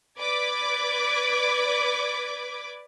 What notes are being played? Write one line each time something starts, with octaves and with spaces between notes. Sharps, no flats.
B4 D5 D6 G#6